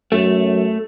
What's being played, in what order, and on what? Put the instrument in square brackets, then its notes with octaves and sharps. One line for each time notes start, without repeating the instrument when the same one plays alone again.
[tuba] F#2 [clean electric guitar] A3